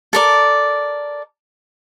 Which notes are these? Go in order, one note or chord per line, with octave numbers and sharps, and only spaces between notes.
A4 A#4 D5